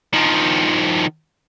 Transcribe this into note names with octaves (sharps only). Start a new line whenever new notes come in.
D#3 F3